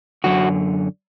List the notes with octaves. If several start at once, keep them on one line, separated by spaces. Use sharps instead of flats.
F#2 D3 F#4